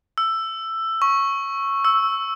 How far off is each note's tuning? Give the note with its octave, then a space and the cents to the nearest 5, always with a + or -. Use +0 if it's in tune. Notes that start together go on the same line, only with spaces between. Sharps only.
E6 +10
C#6 -5
E6 -5